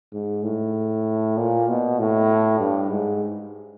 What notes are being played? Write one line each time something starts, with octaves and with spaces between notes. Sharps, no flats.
G#2
A2
A#2
B2
A2
G2
G#2